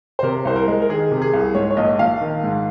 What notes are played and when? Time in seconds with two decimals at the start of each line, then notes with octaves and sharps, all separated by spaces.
0.19 C5
0.23 C3 A#4
0.45 C2 C5
0.56 A#4
0.68 G#3
0.82 A#4
0.89 D#3 G#4
1.11 C3
1.22 G#4
1.33 C2
1.55 G#2 C#5
1.71 C#5
1.77 A#1 D#5
1.99 A#1 F5
2.21 D#3
2.43 G#2